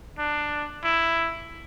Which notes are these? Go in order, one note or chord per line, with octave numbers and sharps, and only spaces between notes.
D4
E4